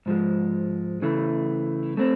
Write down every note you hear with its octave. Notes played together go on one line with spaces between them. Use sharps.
G#2 F3 G#3
C#3 E3 A3
A3 C4